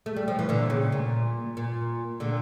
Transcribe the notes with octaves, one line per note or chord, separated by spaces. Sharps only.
A3
G3
F3
E3
A#2 D3
C#3
A#2
A#2
A#2 D3